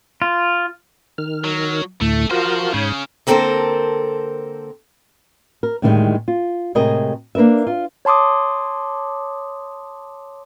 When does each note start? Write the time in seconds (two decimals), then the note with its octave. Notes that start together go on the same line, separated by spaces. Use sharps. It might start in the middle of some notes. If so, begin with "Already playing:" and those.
0.22 F4
1.18 D#3 F6
1.44 F#3
2.01 D2 A2 A3
2.31 F3 F4 F#4 A#4 C5
2.74 G#2 C#3 C#5 G6
3.27 D3 A#3 C4 A4 A#4 C5
5.63 A#4
5.82 A2 D3 D#3 F3 G3 G#3
6.28 F4
6.75 A2 C3 G#3 G#4 A#4 D#5
7.35 A#3 D4 A#4 B4 E5
7.67 F4
8.05 C#5 A5 C6 D6 D#6